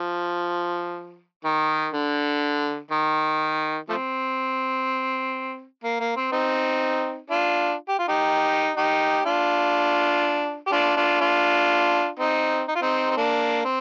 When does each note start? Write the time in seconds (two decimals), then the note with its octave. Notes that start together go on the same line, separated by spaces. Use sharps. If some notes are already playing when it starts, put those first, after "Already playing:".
Already playing: F3
1.44 D#3
1.93 D3
2.91 D#3
3.89 F3 A3 C4
5.84 A#3
6.00 A#3
6.16 C4
6.32 C4 D#4
7.30 D4 F4
7.89 G4
7.99 F4
8.08 D#4 G4
8.76 D#4 G4
9.25 D4 F4
10.67 G4
10.72 D4 F4
10.97 D4 F4
11.21 D4 F4
12.19 C4 D#4
12.68 D#4
12.76 F4
12.82 C4 D#4
13.11 C4
13.17 A#3 D4
13.65 C4